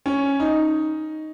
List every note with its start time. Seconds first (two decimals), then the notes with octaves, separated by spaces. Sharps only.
0.06 C#4
0.40 D#4